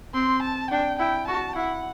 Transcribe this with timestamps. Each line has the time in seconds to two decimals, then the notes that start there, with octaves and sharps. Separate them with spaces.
0.14 C4 C6
0.42 A5
0.70 D4 G5
0.99 E4 G5
1.27 F#4 A5
1.56 E4 F#5